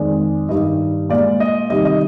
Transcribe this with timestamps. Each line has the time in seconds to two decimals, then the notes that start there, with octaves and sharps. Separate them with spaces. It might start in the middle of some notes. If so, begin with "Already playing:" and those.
Already playing: F2 D#3 G#3 D5
0.49 G2 D#3 G3 D#5
1.10 A#2 G#3 D5
1.40 D#5
1.70 C3 D#3 G3 D#5
1.85 D#5